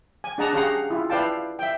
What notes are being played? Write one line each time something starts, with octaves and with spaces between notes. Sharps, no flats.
G#5
D4 G#4 D#5 F#5 A5 A#5
C#4 G4 G#4 F5 F#5 A#5
E4 F4
E4 B4 D5 F5 G5 A5
E5 G5